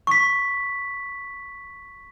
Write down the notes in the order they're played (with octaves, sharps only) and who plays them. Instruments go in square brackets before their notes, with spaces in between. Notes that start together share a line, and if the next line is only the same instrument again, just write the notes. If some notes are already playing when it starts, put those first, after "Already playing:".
[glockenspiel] C#6 B6